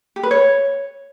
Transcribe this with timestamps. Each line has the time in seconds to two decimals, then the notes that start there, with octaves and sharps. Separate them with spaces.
0.16 G4
0.23 B4
0.31 C#5